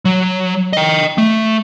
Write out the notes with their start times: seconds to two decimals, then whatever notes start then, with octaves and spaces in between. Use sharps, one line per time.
0.05 F#3
0.73 D#5 G5
1.18 A3